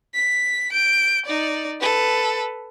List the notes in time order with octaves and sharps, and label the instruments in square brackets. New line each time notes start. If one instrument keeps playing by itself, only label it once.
[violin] B6
G6 D7
D#4 D5
A4 B4